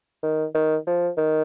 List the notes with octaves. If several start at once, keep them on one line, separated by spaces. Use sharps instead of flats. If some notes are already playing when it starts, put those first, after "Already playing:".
D#3
D#3
F3
D#3